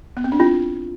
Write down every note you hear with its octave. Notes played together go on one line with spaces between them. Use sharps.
B3
C4
D4
C4 E4 F4